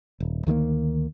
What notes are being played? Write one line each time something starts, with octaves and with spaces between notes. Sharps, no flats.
D#1
D2 D#3 F3 A#3